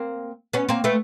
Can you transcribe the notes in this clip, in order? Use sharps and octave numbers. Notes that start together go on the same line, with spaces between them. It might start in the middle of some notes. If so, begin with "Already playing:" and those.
Already playing: A#3 C4
B3 C#4
A#3 C4
A3 B3